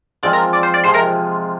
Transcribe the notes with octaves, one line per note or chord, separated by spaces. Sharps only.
F3 G#3 C4 F4 D5 D6
A#4 A#5
D5 D6
C5 C6
D5 D6
C3 F3 G#3 C5 C6
A#4 A#5